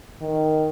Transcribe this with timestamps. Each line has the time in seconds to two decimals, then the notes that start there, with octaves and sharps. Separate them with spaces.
0.21 D#3